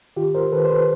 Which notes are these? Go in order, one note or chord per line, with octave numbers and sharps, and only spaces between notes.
D#3 F4 G4
A#4 C5
D#3 A4 B4
C5
A4 B4